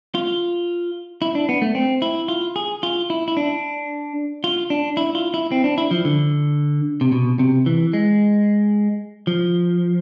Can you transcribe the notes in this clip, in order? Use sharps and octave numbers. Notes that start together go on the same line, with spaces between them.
F4
E4
D4
B3
A3
C4
E4
F4
G#4
F4
E4
E4
D4
F4
D4
E4
F4
E4
C4
D4
E4
F3
D3
C3
B2
C3
E3
G#3
F3